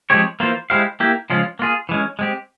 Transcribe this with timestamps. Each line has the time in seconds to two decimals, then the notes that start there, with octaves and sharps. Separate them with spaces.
0.10 F3 G#3 C4 G4 C#5
0.40 E3 A#3 F4 C5
0.70 G#3 E4 G4 C5 F5
1.00 A#3 E4 G4
1.30 C#3 F3 G#3 C#4 F4
1.59 A#3 F4 G#4
1.89 E3 G#3 C#4
2.19 G#3 C4 G4